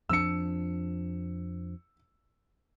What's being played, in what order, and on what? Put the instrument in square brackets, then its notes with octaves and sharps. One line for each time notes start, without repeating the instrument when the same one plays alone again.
[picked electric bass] F2 F3 D4 [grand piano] E6 C#7